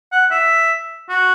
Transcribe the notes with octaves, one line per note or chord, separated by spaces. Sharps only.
F#5
E5
F#4